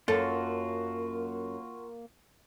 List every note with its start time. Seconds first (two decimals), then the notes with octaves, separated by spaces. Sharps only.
0.08 F#2 A#3 F4 F#4 A4